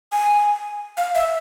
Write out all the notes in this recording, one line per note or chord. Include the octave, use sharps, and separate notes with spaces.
G#5
F5
E5